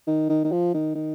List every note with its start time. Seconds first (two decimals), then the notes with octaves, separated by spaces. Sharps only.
0.07 D#3
0.29 D#3
0.44 D#3
0.52 F3
0.74 D#3
0.95 D#3